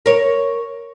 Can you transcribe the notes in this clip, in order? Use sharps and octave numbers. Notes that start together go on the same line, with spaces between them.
A#4 C#5